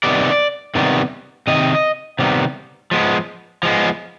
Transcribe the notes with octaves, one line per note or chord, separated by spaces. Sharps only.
C3 D#3 G3 B3 D5
C3 D#3 G3 B3
C3 D#3 D#5
C3 D#3 G3 B3
F3 G#3 B3
F3 G#3 B3